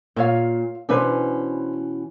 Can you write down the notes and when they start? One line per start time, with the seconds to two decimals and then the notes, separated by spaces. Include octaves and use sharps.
0.16 A#2 F4 C#5 F5
0.89 B2 E3 C#4 D4 B4 C5